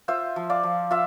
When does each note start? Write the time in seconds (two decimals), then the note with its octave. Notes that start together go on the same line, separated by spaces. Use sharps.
0.08 F4 C5 E5
0.36 F3
0.50 D5 F5
0.63 F3
0.91 F4 E5